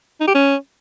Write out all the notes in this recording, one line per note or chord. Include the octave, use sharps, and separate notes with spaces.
D#4
G4
C#4